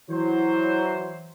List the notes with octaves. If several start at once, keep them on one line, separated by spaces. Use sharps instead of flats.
E3 F#3 C5